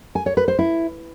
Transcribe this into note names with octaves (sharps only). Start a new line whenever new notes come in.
G#5
C#5
B4
C5
E4